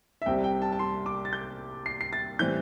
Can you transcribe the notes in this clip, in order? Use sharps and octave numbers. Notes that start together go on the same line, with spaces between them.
E5
C2 C3 G3 C4 G5
G5
A5
A5
C6
D6
A6
G6
C7
C7
A6
A2 E3 G3 C4 G6